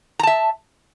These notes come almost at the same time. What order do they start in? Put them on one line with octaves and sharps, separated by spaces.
A#5 A5 E5